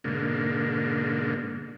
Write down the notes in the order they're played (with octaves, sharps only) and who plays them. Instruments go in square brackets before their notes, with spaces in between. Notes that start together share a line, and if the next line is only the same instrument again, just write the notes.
[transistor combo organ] G#2 B2 D3 A#3